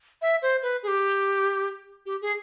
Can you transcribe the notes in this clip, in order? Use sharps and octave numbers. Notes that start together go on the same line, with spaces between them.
E5
C5
B4
G#4
G4
G4
G#4